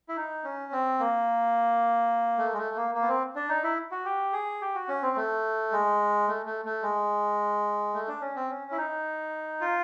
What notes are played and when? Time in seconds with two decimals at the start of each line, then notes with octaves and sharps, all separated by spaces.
0.09 E4
0.16 D#4
0.44 C#4
0.72 C4
1.00 A#3
2.38 A3
2.53 G#3
2.58 A3
2.76 A#3
2.94 A#3
3.02 B3
3.08 C4
3.35 D4
3.49 D#4
3.64 E4
3.91 F#4
4.05 G4
4.33 G#4
4.61 G4
4.75 F#4
4.89 C#4
5.02 C4
5.17 A3
5.72 G#3
6.28 A3
6.46 A3
6.65 A3
6.83 G#3
7.94 A3
8.08 D4
8.21 C#4
8.36 C4
8.50 C#4
8.71 E4
8.78 D#4
9.61 F4